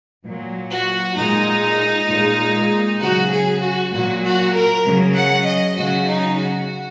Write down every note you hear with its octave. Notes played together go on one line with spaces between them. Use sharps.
A#2 F#3
F#4
A#2 G#3 D#4
A#2 G#3
C#3 F#3 F#4
G#4
F#4
A#2 F#3 F#4
F#4
A#4
C#3 F#3
F#5
D#5
C#3 F#3 F#4
D#4
F#4